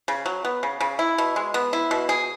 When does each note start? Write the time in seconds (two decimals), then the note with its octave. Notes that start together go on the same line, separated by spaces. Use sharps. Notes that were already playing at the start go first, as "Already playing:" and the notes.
0.08 C#3
0.26 F#3
0.45 B3
0.63 C#3
0.80 C#3
0.99 E4
1.18 B2
1.36 G#3
1.54 B3
1.73 E4
1.91 B2
2.09 G#4